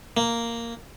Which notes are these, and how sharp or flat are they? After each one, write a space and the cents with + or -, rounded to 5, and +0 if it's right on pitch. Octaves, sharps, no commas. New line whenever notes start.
A#3 -5